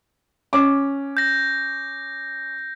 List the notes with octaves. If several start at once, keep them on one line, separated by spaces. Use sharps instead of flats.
C#4 D6
G6 A#6